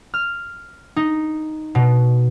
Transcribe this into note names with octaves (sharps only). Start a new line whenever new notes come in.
F6
D#4
B2